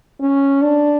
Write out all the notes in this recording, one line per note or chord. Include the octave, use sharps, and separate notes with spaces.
C#4
D4